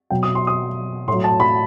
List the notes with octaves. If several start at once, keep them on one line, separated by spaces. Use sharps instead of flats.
B2 F#3 G5
D#6
C6
D#6
A2 F#3 C6
A5
B5